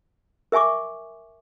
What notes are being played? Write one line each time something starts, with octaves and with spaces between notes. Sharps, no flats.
A#4 E5 G#5 C#6 D6